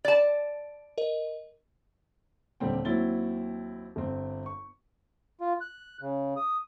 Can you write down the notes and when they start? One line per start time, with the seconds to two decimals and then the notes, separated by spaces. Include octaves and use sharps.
0.05 D5 A5
0.98 A#4 D#5
2.60 D#1 D3 G3 C4 G5
2.85 D#2 F#3 C4 E4 A6 G7
3.96 G1 C4
4.46 C#6
5.41 F4
5.61 F#6
6.01 C#3
6.37 D#6